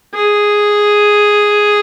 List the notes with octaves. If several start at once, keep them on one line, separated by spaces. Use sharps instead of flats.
G#4